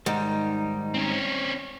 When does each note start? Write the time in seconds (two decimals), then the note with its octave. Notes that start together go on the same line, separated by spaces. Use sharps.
0.06 G#2 D#3 G3 D#4
0.94 C4 C#4